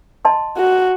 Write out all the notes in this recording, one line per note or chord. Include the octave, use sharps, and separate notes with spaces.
D#5 A5 C6
F#4